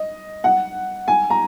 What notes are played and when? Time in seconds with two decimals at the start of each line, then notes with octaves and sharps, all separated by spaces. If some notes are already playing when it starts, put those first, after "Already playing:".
Already playing: D#5
0.44 F#5
1.08 G#5
1.30 A#5